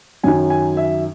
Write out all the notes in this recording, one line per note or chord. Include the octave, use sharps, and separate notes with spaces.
F#2 D#3 F#3 G#5
G#5
E5